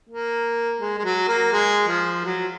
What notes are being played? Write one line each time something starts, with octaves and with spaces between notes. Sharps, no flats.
A#3
G#3
G#3
F#3
A#3
G#3
F3
F#3